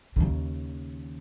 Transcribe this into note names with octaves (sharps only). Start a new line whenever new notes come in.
D#2 C#3